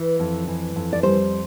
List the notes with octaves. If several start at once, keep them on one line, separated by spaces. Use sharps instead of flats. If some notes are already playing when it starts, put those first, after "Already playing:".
Already playing: E3
F2
E3
F2
D5
G3 C5